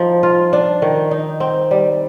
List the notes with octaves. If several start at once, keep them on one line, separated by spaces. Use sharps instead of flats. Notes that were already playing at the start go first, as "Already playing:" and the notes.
Already playing: F3 D#4
F4
D4
D#3
D#4
C4
G3